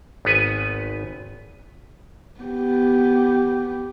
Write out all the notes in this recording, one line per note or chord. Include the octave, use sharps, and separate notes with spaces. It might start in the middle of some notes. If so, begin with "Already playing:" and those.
G#1 B3 B4 G#5
B3 G4